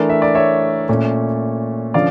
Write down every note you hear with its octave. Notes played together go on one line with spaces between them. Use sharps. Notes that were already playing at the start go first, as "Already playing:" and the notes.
Already playing: E3 A3 D4 A#4 D5
E5
D5
C#5 E5
A#2 A3 C#4
D3 F3 C#4 D5 F5